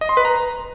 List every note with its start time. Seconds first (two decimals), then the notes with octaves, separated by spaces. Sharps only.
0.01 D#5
0.09 C6
0.17 B4
0.25 A#5